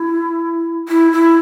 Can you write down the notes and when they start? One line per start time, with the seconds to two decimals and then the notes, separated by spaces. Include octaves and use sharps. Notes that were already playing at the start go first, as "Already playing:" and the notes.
Already playing: E4
0.88 E4
1.12 E4